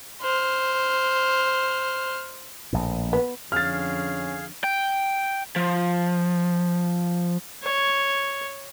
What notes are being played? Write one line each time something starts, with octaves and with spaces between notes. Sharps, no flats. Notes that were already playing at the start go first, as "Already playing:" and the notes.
C5 F6
A#1 A2
B3
F2 D3 C#4 G#4 F5 F6 A6
G5
F3
C#5